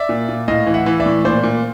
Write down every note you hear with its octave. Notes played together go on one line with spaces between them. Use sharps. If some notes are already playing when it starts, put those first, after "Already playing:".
Already playing: D5 E5
A#2
A#2
A2 D#5 F5
E3
E5 F#5
E3
D5 E5
A2
A#2 C5 D5
A#2